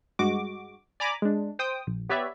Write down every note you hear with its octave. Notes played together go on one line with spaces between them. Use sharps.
G2 G#3 F#4 D6
D5 G#5 A#5 B5 D6
G#3 D4
C5 G5 D#6
A#1
B3 G4 B4 C#5 D5 E5